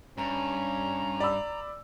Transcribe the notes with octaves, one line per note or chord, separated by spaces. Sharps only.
G2 C#4 A#5
D5 B5 E6